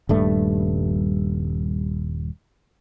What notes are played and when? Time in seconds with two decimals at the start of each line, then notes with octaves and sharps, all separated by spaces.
0.09 D#1 G2 A3